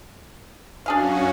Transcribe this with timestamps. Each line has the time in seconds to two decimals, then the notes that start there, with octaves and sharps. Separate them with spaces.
0.86 F#2 C#4 D4 F#4 G#4 F5